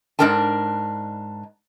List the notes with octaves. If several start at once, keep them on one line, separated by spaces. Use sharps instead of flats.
G#2 D4 A#4 G5 A5